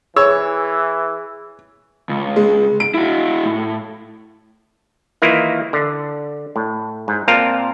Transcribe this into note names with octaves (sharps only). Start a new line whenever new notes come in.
E3 G#4 C#5 E6
C#2
G#3
D7
E4 F#4
A2
D#3 E3 A#3 E4 F4
D3
A2
G#2
A#2 C4 F4 A#4 F5 A5